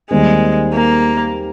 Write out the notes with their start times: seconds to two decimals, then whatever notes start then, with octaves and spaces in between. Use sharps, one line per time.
0.10 D#2 D#3 G3 G#3 C4
0.74 A#3